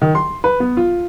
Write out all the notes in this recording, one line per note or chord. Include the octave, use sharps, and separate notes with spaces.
D#3
C6
B4
B3
F4